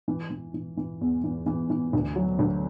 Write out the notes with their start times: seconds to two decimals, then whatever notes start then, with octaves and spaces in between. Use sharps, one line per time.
0.08 E3
0.30 E3
0.54 E3
0.77 E3
1.01 E2
1.24 E3
1.46 E3
1.70 E3
1.93 D2
2.16 F#3
2.39 D2